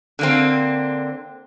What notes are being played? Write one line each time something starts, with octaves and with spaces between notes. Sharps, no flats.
D3 A#3 C4